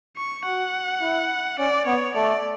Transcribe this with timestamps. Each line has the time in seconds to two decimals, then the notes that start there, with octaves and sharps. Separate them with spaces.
0.17 C#6
0.45 F#4 F#5
1.02 E4
1.59 C#4 D5
1.86 B3 C#5
2.15 A3 D5